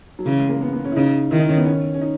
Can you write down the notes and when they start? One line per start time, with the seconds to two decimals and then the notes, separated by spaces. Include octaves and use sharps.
0.19 F#3
0.25 C#3 E3
0.38 G#3
0.49 A#3
0.61 B3
0.73 B3
0.85 C#4
0.92 E4
0.96 C#3 D#4
1.31 D#3 E4
1.40 D#4
1.49 C#4
1.58 B3
1.66 C#4
1.94 C#4
2.01 D#4